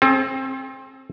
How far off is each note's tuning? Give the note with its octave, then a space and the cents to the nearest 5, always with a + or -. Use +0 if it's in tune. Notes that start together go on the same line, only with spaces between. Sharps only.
C4 +25 A4 -40